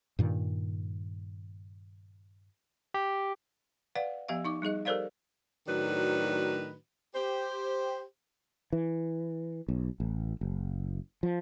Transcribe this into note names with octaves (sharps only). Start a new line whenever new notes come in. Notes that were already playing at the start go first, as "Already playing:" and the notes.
G2 A#2 D#3
G4
B4 D5 F5 F#5
F3 B3 G4 E5 F5
D#4 C#6 D6
G3 D#4 G#4 D#5
G4 A4 A#4 C5 D5 F5
A2 D#3 F#3 D4 F#4 B4
G4 C5
E3
B1
A1
F#1
F3